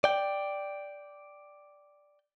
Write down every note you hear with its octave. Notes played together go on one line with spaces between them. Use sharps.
D5 G5